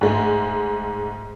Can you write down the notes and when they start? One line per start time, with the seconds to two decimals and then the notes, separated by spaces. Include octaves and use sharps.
0.01 G#2 G#3 A3